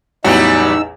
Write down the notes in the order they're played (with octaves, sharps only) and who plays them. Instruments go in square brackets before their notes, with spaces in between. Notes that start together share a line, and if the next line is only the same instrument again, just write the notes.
[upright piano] A1 E2 [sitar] F#3 G3 F#4 [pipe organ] D#4 E6